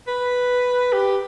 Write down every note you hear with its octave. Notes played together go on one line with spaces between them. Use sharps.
B4
G4